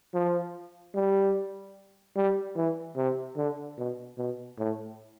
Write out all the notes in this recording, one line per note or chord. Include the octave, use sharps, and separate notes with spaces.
F3
G3
G3
E3
C3
D3
B2
B2
A2